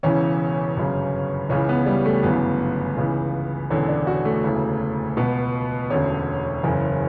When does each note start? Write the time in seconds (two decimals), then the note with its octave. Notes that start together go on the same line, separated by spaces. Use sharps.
0.03 E1 E2 C#3 E3 C#4
0.76 G1 F#2 C#3
1.49 C#2 C#3 E3 C#4
1.69 B3
1.86 G3
2.05 A3
2.23 G1 F#2 C#3 E3 B3
2.97 C#2 C#3 E3
3.70 E1 E2 D3 C#4
3.88 D4
4.07 F#4
4.25 A3
4.43 E1 D2 C#3 E3
5.17 C#2 B2 B3
5.90 E1 D2 D3 C#4
6.64 F#1 E2 C#3